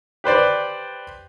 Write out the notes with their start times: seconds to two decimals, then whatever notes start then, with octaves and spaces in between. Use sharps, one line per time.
0.24 G4 B4 C5 D5